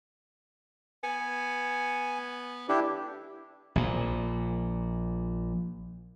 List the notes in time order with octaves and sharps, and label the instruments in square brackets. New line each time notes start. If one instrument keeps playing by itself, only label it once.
[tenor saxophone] B3 [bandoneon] G#5
[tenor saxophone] D3 [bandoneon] D4 E4 G4
[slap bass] A#1 A#2